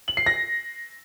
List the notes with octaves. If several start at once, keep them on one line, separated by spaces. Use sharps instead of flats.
F#7
C7
A#6